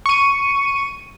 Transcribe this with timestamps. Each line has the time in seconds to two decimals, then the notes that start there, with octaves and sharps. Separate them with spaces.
0.06 C#6 D#7